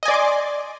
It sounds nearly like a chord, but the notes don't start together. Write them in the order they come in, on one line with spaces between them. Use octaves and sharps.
D#5 G#5 D5 C6 D6